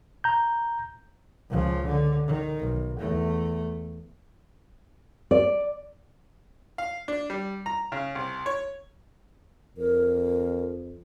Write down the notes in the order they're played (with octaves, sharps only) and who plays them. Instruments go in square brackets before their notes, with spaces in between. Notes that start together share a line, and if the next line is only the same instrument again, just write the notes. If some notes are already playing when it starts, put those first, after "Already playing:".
[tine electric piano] A#5 G6
[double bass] C#2 F3
D3
D#3
B1
E2 A3
[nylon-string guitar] D5
[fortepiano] F5
D4
G3
A#5
C#3
C2
C#5
[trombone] F2 [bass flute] A#4